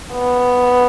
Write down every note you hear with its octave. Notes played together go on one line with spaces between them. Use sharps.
B3